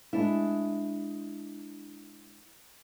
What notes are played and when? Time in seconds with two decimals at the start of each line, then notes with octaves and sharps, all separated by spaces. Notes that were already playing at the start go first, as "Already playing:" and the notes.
0.13 G#3 D4 E4